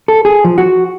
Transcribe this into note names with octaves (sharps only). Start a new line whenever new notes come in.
A4
G#4
F3
F#4